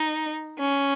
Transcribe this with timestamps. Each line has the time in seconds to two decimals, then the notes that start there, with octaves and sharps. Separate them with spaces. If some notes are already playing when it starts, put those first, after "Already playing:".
Already playing: D#4
0.59 C#4